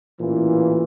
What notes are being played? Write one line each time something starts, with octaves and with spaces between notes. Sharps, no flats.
A1 A#2 E3